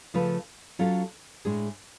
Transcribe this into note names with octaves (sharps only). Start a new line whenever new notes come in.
C#3 F3 A3 F4 B4
F#3 C#4 F4 A4
A2 G#3 D4 G#4